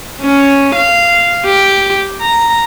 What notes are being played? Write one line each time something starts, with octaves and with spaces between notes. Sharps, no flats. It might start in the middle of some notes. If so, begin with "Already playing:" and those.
C#4
F5
G4
A#5